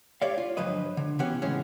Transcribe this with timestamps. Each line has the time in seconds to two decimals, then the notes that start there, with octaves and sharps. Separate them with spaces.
0.22 G4 C#5 D5 F5
0.38 F4
0.57 D2 G2 F3 F#3 B4 D#5
0.97 D3
1.19 B2 E3 C#4 G4 F#5
1.42 A2 C#3 E3 G#3 C#4